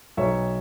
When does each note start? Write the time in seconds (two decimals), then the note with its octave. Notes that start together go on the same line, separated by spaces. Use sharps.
0.17 B1 C#5 E5